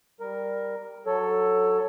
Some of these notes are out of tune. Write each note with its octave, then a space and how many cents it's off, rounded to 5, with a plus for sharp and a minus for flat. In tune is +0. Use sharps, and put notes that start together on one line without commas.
G3 +0 A#4 +0
F#3 -5 A4 +5 C#5 +0